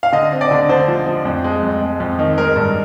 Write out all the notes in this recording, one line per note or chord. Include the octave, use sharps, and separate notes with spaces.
F5
D3 D#5
C4
D5
D3
D3 C5
F3
F3
F2
G#3
F2
G#3
F2
D#3
G#3 A#4
G2